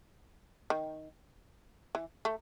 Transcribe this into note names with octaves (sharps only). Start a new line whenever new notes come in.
D#3
E3
A3